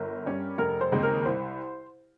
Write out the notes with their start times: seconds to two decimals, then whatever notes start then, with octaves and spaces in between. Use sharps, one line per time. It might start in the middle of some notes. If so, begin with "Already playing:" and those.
Already playing: G1 A#4
0.25 G2 G3 C#4
0.58 F1 A#4
0.81 C5
0.92 D#2 C#3 G#3 C4
1.03 A#4
1.21 A#4
1.25 C2 C5